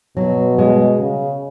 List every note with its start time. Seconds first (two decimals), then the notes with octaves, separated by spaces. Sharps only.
0.17 B2 F#3
0.58 G#3
1.00 C#3